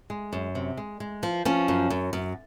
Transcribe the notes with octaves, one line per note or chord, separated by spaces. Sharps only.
G#3
F#2
C3
G#3
G#3
F3
F3 C#4
F#2
F#2
F#2